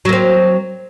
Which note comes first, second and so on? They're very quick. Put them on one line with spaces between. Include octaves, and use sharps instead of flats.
F#3 A#3 C4